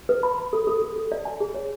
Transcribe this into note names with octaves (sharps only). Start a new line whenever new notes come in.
B4
B5
B5
A4
A4
A4
A4
D5
G#5
G#4
C#5